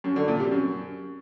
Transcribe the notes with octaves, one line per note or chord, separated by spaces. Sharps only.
F#2
D3
A#2
C3
F#2